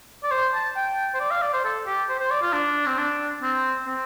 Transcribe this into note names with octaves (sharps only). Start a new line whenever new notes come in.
D5
C5
A5
G5
C5
D5
F5
D5
C5
A4
G4
C5
C5
D5
F4
D4
C4
D4
C4
C4